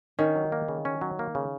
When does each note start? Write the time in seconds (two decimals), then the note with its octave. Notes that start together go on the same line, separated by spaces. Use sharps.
0.19 D#3 C#4
0.36 F#3
0.52 A#3
0.68 C#3
0.85 C#4
1.01 F#3
1.19 A#3
1.35 C#3